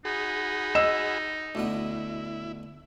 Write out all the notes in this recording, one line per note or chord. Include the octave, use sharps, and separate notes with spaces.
D#4 F#4 G#4 B5
D#5 E6 E7
D2 B2 B3 E4